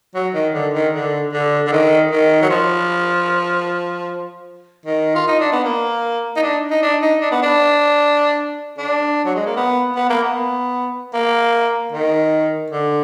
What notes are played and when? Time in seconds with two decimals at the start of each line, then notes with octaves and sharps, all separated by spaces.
0.15 F#3
0.34 D#3
0.54 D3
0.74 D#3
0.93 D3
1.33 D3
1.67 D3
1.72 D#3
2.11 D#3
2.42 F#3
2.50 F3
4.85 D#3
5.15 F4
5.27 D#4
5.40 D4
5.52 B3
5.64 A#3
6.36 D#4
6.43 D4
6.71 D#4
6.82 D4
7.02 D#4
7.21 D4
7.31 B3
7.42 D4
8.78 D4
9.25 F#3
9.35 G#3
9.46 A#3
9.56 B3
9.96 B3
10.09 A#3
10.24 B3
11.14 A#3
11.92 D#3
12.70 D3